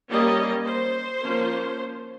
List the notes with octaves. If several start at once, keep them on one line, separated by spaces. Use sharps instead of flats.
G3 A#3 C#4 D#5
C5
F3 A#3 C#4